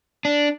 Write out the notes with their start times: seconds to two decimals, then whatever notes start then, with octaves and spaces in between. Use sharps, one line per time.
0.25 D4